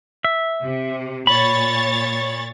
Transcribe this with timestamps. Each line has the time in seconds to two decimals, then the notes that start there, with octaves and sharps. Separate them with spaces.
0.25 E5
0.62 C3
1.27 A#2 C#5 B5 A6